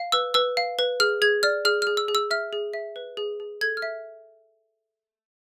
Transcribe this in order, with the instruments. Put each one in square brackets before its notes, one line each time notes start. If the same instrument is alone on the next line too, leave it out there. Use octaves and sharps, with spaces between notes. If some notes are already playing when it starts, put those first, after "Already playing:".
Already playing: [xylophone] F5
B4 E6
B4 E6
F5
B4
G#4 F6
G#4 G#6
D5 F6
G#4 F6
G#4 F6
E6
G#4
E6
E5 F6
G#4
E5
B4
G#4
G#4
A4 G#6
F6
E5